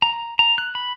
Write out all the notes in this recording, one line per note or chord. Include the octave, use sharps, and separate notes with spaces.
A#5
A#5
F#6
B5